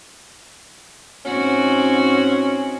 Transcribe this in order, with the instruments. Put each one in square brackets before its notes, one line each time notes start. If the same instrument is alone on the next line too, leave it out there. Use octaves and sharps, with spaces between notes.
[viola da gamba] G#2 C4 F#4 [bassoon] C#4